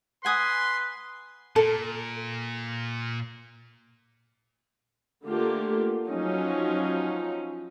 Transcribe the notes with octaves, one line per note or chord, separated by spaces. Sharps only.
B4 F#5 G#5 C6 D#6
A#2 A4
D3 A3 A#3 F4 G4
F3 F#3 C#4 D#4